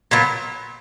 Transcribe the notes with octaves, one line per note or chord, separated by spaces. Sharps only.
A#2 F#3 B3